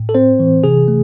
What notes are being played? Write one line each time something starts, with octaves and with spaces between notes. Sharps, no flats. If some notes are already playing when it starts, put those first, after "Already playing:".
Already playing: A2
A4
C4 C5
E3
C3 G#4
A3